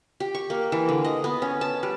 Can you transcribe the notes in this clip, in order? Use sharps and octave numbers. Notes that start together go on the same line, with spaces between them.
G4
C#6
A#3
E3
D3
D#5
B3
C#4
A5
G3